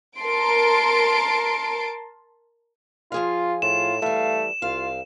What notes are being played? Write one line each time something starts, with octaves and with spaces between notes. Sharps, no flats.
A#4 A5 C6 D7
F3 F4 G#4 F5
A2 F4 E7
E3 G3 A3 F5
C2 F4 F5